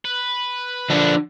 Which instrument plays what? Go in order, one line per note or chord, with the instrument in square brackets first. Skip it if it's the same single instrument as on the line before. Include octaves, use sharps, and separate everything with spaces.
[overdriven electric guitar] B4
[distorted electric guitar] D3 [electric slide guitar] F3 D4